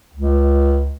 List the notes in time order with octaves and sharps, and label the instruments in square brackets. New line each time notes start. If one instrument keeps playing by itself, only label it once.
[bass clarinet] C#2